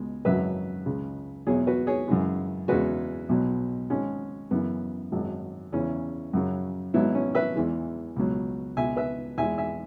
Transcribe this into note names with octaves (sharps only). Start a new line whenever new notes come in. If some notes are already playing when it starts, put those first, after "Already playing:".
Already playing: C#2 B2 G#3
G#1 F#2 C#3 F#3 B4 E5
C#2 C#3 G#3
E2 B2 F#3 G#4 C#5
F#4 B4
G#4 C#5
F#2 C#3 E3 G#3
E2 C#3 G#3 F#4 B4
B1 B2 F#3
G#1 G#2 G#3 C#4
F#2 C#3 E3 B3
G#1 F#2 F#3
E2 C#3 E3 C#4
F#2 C#3 F#3
G#1 G#2 F#3 B3 E4
C#4
B4 E5
E2 E3 G#3
C#2 B2 F#3
C#2 B2 G#3 E5 G#5
B4 E5
E2 E3 G#3 E5 G#5
E5 G#5